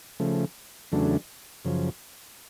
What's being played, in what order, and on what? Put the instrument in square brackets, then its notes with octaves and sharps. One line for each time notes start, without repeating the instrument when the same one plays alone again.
[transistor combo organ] C#3 F3 A3
E2 C#3 F#3 A3 D4
F#2 C#3 F3